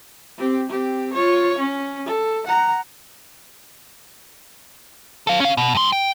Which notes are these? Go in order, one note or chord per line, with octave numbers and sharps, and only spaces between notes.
C4 G4
C4 G4
F4 C#5
C#4
A4
F#5 A#5
A4 F5
C#4 F5
B2
G2 C6
G5